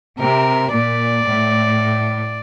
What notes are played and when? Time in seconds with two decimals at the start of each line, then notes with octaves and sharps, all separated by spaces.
0.19 C3 A#4
0.72 A#2 D5
1.25 A2